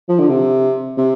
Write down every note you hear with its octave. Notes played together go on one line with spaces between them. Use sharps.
F3
D3
C3
C3